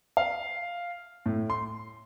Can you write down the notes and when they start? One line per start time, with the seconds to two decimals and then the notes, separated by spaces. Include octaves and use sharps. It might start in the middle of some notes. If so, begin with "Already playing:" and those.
0.17 F5
1.26 A2
1.50 C6